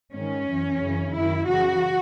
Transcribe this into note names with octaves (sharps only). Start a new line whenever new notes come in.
G#2 D#3 C#4
F#2 E3
F#2 C#3 E3
F#2 D#3 E4
F#2 C#3 E3 F#4